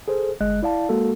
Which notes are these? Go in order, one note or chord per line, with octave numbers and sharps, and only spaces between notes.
G#4 A4 C5
G1 G#3 D#5 F#6
E4 D5 F5 A5
G#3 A#3 F#4 A4